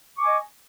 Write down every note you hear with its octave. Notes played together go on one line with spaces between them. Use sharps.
D#5 G#5 C#6 D6